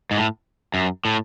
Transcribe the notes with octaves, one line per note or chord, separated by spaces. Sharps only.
G#2
A2
F#2
A2